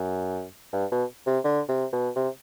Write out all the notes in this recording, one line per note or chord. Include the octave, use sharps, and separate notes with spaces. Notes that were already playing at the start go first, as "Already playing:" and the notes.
Already playing: F#2
G2
B2
C3
D3
C3
B2
C3